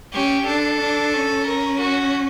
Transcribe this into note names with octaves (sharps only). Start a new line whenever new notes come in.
C#4 G4
D4 A4
D4
C#4
A#4
F#4